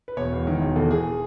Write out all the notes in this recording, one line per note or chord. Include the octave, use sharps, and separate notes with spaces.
B4
E1 C#5
E2
D#3
E1
E2 A4
E1 G#4